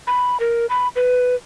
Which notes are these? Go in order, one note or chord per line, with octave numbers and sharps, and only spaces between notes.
B5
A#4
B5
B4